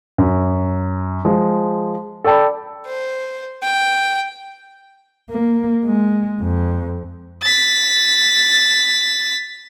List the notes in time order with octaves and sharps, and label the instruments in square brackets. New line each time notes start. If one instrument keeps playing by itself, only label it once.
[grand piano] F#2
F3 G#3
A4 D5 G5 A5 B5
[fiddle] C5
G5
[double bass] A#3
G#3
F2
[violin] A6 B6